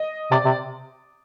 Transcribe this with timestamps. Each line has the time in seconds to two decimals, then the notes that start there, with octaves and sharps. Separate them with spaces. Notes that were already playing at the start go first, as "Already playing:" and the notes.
Already playing: D#5
0.31 C3 D5
0.45 C3